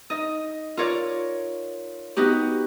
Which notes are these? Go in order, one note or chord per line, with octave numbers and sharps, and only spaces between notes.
D#4 D#5
F4 A#4 C#5 D5
B3 D#4 F#4 G4